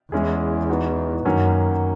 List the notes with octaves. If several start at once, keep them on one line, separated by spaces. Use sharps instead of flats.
E2 G#3 C#4 E4 G#4
E3 B3 D#4 F#4
F#2 D#3 F#3 A#3 C#4